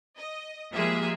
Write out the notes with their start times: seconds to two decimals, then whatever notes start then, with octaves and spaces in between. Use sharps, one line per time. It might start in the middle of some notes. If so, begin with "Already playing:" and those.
0.17 D#5
0.73 F3 G3 G#3 A#3 G#4 E5